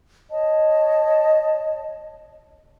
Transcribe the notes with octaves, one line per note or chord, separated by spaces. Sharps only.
C#5 D#5 A5